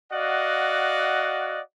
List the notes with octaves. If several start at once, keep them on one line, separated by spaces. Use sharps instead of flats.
F#4 D5 D#5 F5 F#5